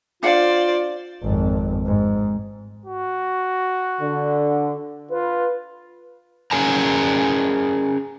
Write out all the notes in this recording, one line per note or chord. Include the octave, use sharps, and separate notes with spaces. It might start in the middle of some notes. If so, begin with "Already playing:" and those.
D4 F4 C5 D5 F5 F#5
G#1 F2
G#2
F#4
D3
F4 B4
C#4 G#4 A#4 G#5 A#5